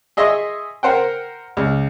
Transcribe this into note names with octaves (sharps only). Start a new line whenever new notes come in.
G#4 D#5 E5 G#5 C6 C#6
A#4 C5 F#5 G5
C#2